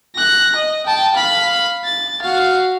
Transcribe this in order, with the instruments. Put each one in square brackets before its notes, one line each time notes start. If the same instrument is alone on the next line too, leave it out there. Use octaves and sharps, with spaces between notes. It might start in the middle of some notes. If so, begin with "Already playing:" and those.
[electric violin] F#6 A#6
D#5
G5 A5
F5 B5
A6
F#4 F5